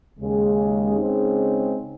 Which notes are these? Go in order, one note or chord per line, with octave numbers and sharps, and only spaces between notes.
D#2 C#3 G#3
C#3 G#3 C4 D#4